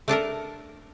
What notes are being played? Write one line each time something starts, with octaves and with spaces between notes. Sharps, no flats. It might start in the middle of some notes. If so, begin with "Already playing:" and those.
A3 D4 A4 A#4